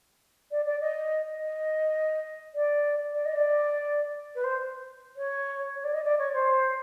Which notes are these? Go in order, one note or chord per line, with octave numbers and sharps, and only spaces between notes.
D5
D5
D#5
D#5
D5
D5
D#5
D5
B4
C5
C#5
C#5
D5
D#5
D5
C#5
C5